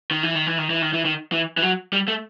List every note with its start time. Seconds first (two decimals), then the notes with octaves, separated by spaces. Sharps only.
0.11 D#3
0.23 E3
0.35 D#3
0.47 E3
0.58 D#3
0.70 E3
0.82 D#3
0.93 E3
1.05 D#3
1.32 E3
1.57 E3
1.62 F#3
1.93 G3
2.08 A3